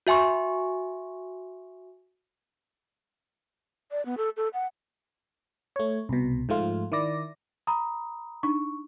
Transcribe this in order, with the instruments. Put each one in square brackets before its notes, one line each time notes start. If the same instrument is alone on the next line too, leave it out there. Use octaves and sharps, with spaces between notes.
[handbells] F#4 E5 G#5 C6 C#6
[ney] D5
B3
A4
A4
F#5
[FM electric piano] A3 C#5
C2 B2
G#2 F3 A3 F4
D#3 E4 D5 A#6
[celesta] A#5 B5 D#6
[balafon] D4 D#4 [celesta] C#6